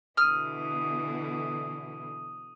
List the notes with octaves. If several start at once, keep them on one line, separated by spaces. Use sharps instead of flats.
B2 D3 E3 D#6 F6 D#7